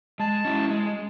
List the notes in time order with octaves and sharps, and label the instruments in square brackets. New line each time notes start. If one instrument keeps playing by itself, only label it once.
[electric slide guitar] G#3 [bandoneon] A5
[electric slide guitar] C#4 E4
G#3